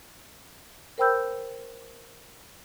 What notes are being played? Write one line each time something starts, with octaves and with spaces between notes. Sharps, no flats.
A#4 C5 G5 B5 E6 G6